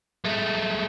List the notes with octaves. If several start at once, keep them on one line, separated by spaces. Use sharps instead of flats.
G#3 A3